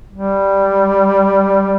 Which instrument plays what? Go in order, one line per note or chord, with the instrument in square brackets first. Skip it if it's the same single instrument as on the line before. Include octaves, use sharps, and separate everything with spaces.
[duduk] G3